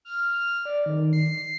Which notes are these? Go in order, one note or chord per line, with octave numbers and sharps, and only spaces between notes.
F6
D5
D#3
C7